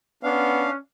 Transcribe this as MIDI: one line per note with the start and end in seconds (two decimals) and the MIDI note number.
0.23 0.66 59
0.23 0.77 61
0.23 0.70 62
0.23 0.70 77